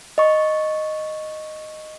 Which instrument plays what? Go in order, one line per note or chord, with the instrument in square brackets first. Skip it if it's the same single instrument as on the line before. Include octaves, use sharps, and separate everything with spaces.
[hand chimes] D#5 C#6